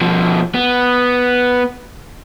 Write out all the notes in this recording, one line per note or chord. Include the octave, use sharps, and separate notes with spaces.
B2 F3
B3